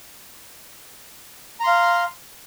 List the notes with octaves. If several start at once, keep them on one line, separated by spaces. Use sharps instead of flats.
F5 A#5 C6